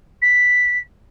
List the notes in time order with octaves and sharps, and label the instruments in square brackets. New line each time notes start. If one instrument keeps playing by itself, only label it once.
[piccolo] B6